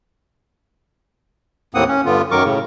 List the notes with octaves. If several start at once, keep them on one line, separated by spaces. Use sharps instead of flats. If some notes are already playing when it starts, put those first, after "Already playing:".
D#2 A2 A#3 C4 F#5 D#6
C#4
G2 D3 B3 F4
F#2 D#3 F#3 A#4 C#6 D6
A2 C#3